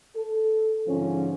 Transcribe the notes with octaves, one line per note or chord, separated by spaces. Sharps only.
A4
G#2 D3 F3 C#4